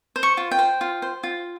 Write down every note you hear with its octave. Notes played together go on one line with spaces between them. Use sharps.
C5
C#6
F4
G5
C5
F4
C5
F4